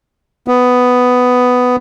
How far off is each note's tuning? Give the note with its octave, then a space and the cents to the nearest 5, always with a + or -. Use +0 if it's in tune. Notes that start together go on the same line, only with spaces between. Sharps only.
B3 +10